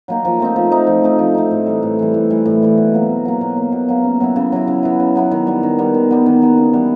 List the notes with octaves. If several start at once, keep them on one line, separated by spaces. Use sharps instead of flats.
F#3 A#3 D#4
F3
A3 C4 D#4
F3
A3 C4 D#4
F3
A3 C4 D#4
F3
A3 C4 D#4
A2
E3 G3
A2
E3 G3
A2
E3 G3
A2
E3 G3
B2
F#3 A#3
B2
F#3 A#3
B2
F#3 A#3
B2
F#3 A#3
C#3
F#3 B3 E4
C#3
F#3 B3 E4
C#3
F#3 B3 E4
C#3
F#3 B3 E4
D#3
G3 B3
D#3
G3 B3
D#3
G3 B3
D#3
G3 B3
C#3
E3 G3 B3